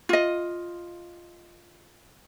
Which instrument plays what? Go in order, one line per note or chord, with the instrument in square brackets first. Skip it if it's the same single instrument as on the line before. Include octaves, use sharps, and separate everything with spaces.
[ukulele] F4 D#5